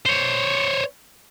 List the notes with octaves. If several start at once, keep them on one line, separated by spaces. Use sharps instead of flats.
C5 C#5